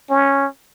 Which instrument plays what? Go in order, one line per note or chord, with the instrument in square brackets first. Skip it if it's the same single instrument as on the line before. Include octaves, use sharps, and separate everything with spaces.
[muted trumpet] C#4